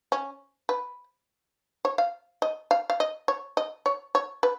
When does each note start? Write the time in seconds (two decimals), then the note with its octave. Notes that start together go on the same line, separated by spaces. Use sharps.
0.12 C#4
0.69 B4
1.85 C#5
1.98 F5
2.42 D#5
2.71 F5
2.90 F5
3.00 D#5
3.28 C#5
3.57 D#5
3.86 C#5
4.15 C#5
4.43 B4